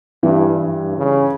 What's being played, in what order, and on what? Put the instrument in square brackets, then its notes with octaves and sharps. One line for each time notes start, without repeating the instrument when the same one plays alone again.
[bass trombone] G2 [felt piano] E3
[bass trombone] G2
C#3